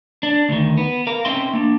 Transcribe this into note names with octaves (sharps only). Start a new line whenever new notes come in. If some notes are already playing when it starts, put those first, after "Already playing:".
D4
D2 D#3
B3
A#4 F5
C4 C#4 D#4 E5 G5 C6
A#3 D4